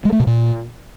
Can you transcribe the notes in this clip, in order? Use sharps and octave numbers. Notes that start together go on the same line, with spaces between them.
G#3
A3
B2
A#2